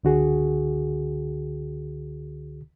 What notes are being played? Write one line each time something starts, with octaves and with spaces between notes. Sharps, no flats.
C#2 D3 F#4 G#4